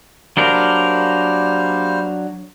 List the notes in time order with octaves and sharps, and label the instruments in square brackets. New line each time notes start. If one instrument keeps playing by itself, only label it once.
[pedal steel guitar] F#3 D4 A#4 [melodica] G3 A#3 C5